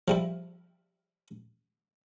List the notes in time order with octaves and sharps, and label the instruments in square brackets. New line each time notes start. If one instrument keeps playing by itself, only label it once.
[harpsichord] F3 G3 E4